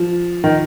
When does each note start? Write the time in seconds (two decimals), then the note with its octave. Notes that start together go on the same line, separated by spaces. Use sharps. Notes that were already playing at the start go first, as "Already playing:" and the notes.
Already playing: F3
0.44 D#3